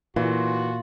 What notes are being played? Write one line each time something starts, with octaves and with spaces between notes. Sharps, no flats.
A#2 E3 F4 F#4